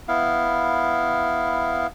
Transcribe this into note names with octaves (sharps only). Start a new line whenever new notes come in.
B3 E4 F5